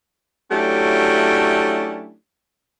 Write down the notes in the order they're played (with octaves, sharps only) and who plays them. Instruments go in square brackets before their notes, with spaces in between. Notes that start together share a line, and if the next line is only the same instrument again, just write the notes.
[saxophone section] F#3 A3 C#4 D4 E4 G4